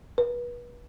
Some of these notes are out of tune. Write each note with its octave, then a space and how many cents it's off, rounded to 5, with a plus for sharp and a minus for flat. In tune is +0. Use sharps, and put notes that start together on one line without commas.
B4 -30